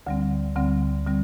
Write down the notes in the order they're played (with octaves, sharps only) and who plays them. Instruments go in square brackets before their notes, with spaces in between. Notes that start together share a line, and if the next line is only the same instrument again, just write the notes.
[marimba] D2 D3 G3 C4
D2 D3 G3 C4
D3 G3 C4